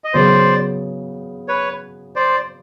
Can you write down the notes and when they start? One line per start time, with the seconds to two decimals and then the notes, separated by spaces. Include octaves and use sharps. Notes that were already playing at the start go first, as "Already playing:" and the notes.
0.04 D#5
0.13 C#3 F#3 B3 C5 D5
1.48 B4 C#5
2.16 C5 D5